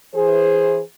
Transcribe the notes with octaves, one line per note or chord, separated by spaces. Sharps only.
E3 G#4 C5